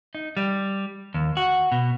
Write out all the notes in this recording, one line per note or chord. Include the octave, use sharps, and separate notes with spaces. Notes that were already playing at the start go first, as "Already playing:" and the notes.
D#4
G3
D#2
F#4
B2